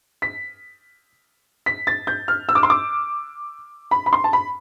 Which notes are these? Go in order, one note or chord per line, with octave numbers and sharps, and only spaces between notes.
B6
B6
A6
G6
F6
E6
D6
C6
D6
B5
B5
C6
A5
B5